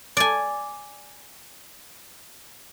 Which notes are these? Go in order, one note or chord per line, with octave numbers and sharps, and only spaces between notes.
D5 G#5